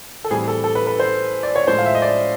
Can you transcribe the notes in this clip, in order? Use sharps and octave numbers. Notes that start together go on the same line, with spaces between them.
A4
A2 E3 G3 C4 G#4
A4
A4
B4
B4
C5
D5
C#5
A2 F3 G#3 C5
F5
E5
D#5
D5